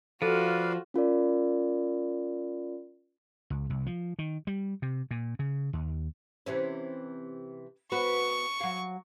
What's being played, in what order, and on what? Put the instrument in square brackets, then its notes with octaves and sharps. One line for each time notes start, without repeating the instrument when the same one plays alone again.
[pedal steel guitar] F3 [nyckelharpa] F4 F#4 [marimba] A4 [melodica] B4 D5 F5
[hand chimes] C#4 F4 A#4 D5
[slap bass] C#2
C2
F3
D#3
G3
C3
A#2
C#3
D#2
[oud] C3 E3 C#4
[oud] B3 F#4 B4 [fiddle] C#6
[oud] F#3 F5